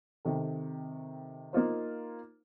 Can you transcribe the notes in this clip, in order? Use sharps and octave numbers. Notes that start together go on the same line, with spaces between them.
C3 D#3 A4
A#3 D#4 F4 C5